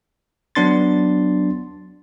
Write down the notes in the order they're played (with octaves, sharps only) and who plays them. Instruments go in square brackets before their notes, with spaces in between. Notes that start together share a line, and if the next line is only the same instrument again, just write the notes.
[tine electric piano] F#3 B3 D4 C6 A6